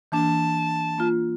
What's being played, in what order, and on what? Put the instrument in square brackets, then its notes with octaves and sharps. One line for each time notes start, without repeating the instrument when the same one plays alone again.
[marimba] E3 A#3 D4 [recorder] A5
[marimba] A#3 F4